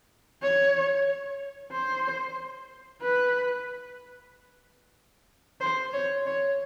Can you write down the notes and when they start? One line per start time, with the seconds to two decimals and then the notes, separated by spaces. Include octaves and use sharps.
0.42 C#5
1.72 C5
3.02 B4
5.61 C5
5.93 C#5
6.26 C#5